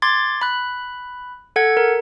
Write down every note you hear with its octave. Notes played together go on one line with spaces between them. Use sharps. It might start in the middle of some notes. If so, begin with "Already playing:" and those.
C6 D6 G#6 A6
B5 F#6
A4 F#5 G#6
A#4